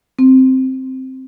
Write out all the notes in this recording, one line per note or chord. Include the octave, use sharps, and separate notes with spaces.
C4